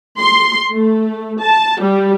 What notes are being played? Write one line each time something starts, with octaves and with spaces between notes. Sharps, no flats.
C6
A3
A5
G3